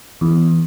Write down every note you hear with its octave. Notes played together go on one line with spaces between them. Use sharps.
E2